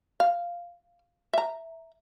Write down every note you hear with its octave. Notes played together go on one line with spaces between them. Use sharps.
F5
E5 A#5